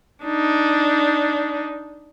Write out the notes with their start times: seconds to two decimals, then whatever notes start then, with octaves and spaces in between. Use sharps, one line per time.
0.25 D4 D#4